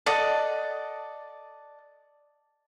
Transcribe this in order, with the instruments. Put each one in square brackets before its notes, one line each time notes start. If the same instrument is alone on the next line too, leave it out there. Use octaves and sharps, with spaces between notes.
[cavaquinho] A4 D5 D#5 F#5